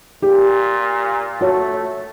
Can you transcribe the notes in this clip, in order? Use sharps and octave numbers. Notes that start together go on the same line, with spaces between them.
A#2 G4
A3 F#4 C#5